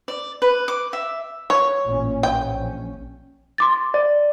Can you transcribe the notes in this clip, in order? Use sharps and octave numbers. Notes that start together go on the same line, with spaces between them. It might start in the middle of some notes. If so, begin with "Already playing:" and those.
D5
B4
D6
E5
C#5
A1 A#2 C#4
A#1 C#4 G5
C6 D6 A6
D5